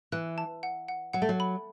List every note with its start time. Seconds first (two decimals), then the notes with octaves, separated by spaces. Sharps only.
0.12 E3 F#6
0.38 A5
0.63 F#5
0.88 F#5
1.13 F#3 F#5
1.22 A3
1.29 F#3
1.40 B5